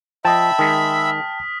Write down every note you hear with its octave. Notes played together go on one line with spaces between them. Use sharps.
F3 D#5 E5 G5 A5 B5 E6
D#3 G#3 D#6 F6 B6